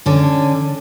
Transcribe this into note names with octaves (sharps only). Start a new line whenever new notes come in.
D3 C#4